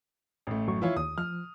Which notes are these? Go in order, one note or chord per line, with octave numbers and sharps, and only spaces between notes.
A1 A3
F#2 F#3 C#6
E3 F3 E4 F4 C#5
D#2 D#6
F3 F6